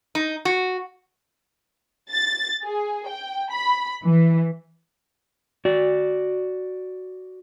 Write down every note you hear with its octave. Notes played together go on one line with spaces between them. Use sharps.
D#4
F#4
A6
G#4
G5
B5
E3
F#4 D5